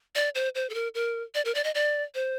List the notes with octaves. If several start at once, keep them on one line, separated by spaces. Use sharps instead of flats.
D5
C5
C5
A4
A#4
A#4
D5
A#4
D5
D#5
D5
C5